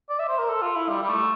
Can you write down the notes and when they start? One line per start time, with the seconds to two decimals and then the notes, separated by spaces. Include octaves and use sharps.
0.09 D5
0.19 E5
0.29 C5
0.39 A#4
0.49 A4
0.62 F4
0.76 E4
0.89 G3
1.03 G3
1.09 A3